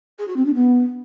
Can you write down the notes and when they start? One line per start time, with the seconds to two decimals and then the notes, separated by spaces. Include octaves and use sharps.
0.18 G#4
0.27 F#4
0.36 C4
0.45 D4
0.54 B3